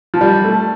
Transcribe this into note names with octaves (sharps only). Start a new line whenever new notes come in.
F3
G3
A3